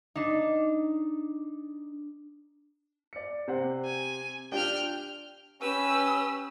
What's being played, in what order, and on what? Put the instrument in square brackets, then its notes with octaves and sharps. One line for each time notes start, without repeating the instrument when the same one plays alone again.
[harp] D4 D#4
[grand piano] D5 C#7
C3 C5 F#5
[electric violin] G#5
[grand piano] D4 F4 G4 [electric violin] G5 F6
[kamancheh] C#4 [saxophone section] G4 B4 [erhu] E6